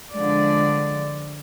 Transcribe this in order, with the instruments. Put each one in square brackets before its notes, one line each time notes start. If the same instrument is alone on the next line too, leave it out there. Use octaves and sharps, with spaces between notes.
[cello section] D3 F3 G#3 D5